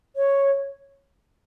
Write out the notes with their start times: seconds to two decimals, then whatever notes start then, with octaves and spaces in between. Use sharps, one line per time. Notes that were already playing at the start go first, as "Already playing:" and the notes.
0.16 C#5